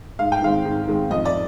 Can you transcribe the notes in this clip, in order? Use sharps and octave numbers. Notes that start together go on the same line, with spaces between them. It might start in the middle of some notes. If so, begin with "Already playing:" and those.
G#2 F5
G5
D#3 G#3 C4 F5
G#2
D#3 G#3 C4
F2 D#5
D5